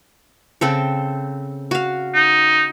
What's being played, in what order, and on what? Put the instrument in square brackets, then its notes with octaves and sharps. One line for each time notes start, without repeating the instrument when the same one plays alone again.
[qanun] C#3 C4 A4
F#4 F5
[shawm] D#4